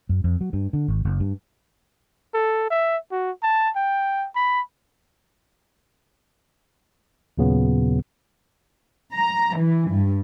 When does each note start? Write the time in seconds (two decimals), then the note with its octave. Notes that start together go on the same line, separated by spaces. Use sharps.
0.09 F#2
0.24 F2
0.41 F#3
0.53 G2
0.73 D3
0.88 G#1
1.05 F#1
1.20 G2
2.34 A4
2.71 E5
3.11 F#4
3.43 A5
3.76 G5
4.35 B5
7.38 D#2 A#2 C#3 F#3 B3
9.15 A#5
9.57 E3
9.90 G2